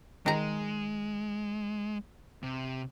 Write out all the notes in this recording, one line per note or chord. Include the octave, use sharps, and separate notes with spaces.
D#3 G#3 A#5
C3